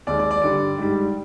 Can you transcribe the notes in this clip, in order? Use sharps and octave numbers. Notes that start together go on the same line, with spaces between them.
D#2 D#3 G#3 D5
D5
D5
G2 D3 G3 D5
G#2 G3